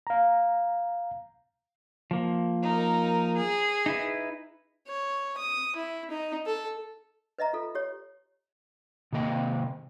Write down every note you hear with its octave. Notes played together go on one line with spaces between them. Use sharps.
F5 A#5
F3 A#3
D#4 A#4
G#4
D#4 E4 B4
C#5
D#6
E4
D#4
A4
B4 D#5 E5 A#5
F4 A4
G4 C#5
C3 D#3 A#3 D#5 G5